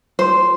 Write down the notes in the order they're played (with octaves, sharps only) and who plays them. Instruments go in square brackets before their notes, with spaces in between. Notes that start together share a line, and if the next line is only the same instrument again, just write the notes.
[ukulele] C5